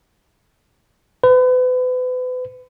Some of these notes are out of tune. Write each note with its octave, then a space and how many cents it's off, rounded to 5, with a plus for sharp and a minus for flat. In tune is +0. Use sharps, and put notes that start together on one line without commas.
B4 +35